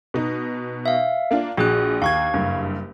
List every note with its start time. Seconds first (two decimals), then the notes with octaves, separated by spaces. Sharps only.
0.14 B2 D#4
0.86 E5 F5
1.31 A#3 D4 F4
1.57 A#1 F#4 G#4 F#6
2.02 D#2 F5 C#6 G#6
2.34 F#1 G2